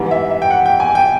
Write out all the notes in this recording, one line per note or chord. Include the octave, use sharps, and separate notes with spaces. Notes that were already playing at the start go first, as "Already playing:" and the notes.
Already playing: G#2 E3 G3 B3
E5
E5
G5
F#5
G5
G#5
G5